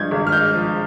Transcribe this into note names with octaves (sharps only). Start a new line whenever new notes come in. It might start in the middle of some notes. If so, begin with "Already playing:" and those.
Already playing: G2 F3 G#3 G6 G#6
G#1
F6
G#3 G6
F3